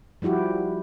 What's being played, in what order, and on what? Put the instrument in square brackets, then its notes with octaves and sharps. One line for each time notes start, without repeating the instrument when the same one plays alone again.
[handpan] F3 G3 E4 F#4 G4